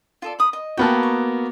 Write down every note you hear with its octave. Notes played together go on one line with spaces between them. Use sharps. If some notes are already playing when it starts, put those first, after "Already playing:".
F4 A4 D5
B5 D#6
D#5
A#3 B3 F#4 G5 A5
C#6